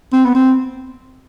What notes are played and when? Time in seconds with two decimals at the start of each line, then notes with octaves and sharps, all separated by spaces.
0.13 C4
0.25 B3
0.35 C4